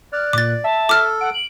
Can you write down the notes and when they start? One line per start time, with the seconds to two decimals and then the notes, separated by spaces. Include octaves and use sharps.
0.13 D5 F6 F#6
0.33 A#2 D6 A6
0.64 E5 A5
0.89 A4 D6 F6
1.21 F#5 D7
1.34 F#7